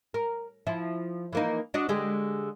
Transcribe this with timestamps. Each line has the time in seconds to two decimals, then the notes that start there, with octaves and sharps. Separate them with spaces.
0.14 A#4
0.67 F3 E4
1.33 E3 A#3 D#4
1.74 D4 F#4 D#5
1.89 D3 G#3 G4